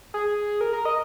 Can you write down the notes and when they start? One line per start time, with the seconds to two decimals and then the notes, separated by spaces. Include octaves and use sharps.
0.14 G#4
0.61 A#4
0.73 A#4
0.85 D#5